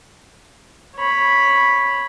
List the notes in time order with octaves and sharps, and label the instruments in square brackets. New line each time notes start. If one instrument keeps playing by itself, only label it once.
[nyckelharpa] C#5 B5